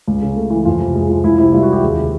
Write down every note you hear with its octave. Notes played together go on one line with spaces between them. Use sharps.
C#2
C#3
A3
E3
F2 F4
C3
G#3
F3
C#2 E4
C3 E4
G3 F4
F#4
E3 G4
D#2 G#4
C#3